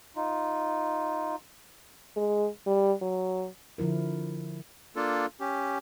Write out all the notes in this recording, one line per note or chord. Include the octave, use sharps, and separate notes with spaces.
D#4 F4
G#3
G3
F#3
D3 F3 E4 A#4
A#3 D4 F4 A4
C#4 G4